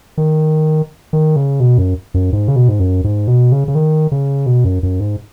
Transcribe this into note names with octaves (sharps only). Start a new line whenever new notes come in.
D#3
D#3
C#3
B2
F#2
F#2
G#2
C#3
B2
G#2
F#2
G#2
B2
C#3
C#3
D#3
C#3
B2
F#2
F#2
G#2